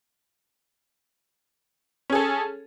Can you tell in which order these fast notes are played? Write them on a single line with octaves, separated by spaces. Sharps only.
C#4 G#4 A4